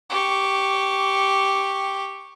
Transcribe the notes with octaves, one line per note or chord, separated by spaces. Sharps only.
G4 C#6